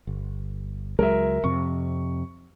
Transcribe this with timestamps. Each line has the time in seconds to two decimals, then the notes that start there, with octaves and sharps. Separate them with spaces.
0.07 G1
0.99 C#2 F#3 G#3 A#4 E5
1.44 F2 C3 C#6